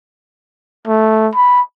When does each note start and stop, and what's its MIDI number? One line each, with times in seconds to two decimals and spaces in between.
0.87 1.29 57
1.35 1.62 83